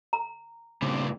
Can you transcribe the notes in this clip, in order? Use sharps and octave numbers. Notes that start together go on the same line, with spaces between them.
A#5
G2 A#2 C#3 C4 D4